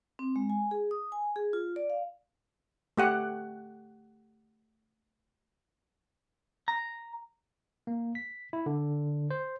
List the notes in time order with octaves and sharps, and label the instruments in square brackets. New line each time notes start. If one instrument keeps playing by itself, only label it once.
[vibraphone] C4
G#3
G#5
G#4
D#6
G#5
G#4
F4
D5
F5
[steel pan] A3 G4 F#5
[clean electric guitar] A#5
[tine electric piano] A#3
B6
E4
D3
C5